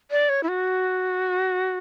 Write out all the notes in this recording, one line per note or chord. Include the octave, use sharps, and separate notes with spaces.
D5
C#5
E4
F#4